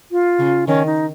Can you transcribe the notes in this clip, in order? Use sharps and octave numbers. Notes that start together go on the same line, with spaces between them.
F4
C#3
D#3 C#4
D#4